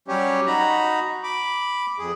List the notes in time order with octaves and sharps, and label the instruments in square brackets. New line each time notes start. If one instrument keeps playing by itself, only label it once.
[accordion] F#3 G3 C#4 G4 C#5
D#4 F#4 A#5 B5
B5 D6
F2 G#4